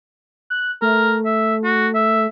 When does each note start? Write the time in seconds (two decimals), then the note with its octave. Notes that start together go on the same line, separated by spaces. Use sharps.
0.50 F#6
0.82 A3 A#4
1.25 E5
1.64 F#4
1.95 E5